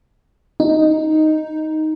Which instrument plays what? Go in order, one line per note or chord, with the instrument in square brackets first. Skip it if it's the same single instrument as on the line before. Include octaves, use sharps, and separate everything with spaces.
[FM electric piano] D#4